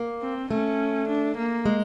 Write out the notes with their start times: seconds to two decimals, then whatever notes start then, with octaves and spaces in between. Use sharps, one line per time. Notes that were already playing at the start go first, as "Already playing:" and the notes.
Already playing: A#3
0.22 C4
0.51 A3 C#4
1.08 D4
1.38 A#3
1.66 G#3